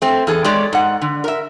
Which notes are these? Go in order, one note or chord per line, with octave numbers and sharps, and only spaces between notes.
A3 C4
E2 G#4 A4
G#3 G4 C#5 D5
G#2 F#5
D3
A#4 E5